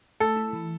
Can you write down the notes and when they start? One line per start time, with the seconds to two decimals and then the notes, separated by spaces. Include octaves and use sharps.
0.20 A3 A4
0.36 E4
0.53 E3